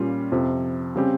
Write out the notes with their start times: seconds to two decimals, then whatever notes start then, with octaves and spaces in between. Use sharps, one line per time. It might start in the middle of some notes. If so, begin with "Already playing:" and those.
Already playing: A#2 G3 C#4 F4
0.32 F2 C3 F3
0.96 C#3 G3 C4 G4